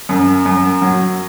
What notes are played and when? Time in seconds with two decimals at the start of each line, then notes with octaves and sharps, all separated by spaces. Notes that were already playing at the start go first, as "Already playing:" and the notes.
0.09 F#2
0.46 F#2
0.82 F#3